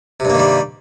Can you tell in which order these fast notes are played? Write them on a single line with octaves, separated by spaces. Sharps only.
C3 G2 A#3 D#3 G3